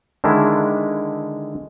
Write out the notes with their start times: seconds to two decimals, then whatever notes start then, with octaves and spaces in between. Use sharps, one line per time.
0.24 D3 D#3 G#3 D4 E4